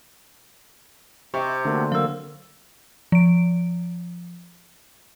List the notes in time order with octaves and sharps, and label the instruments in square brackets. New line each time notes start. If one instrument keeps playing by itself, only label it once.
[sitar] C3 [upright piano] D#5 E5 C#6
[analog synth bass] D3 [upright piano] A3 A#3 F#4
[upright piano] F#3 A#3 [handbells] F5 E6
[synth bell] F3 D7